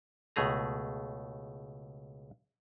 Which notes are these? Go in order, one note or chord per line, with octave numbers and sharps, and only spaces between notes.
C#2 B2 A3 G#4 A#5